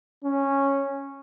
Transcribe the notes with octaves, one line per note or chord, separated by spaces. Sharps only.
C#4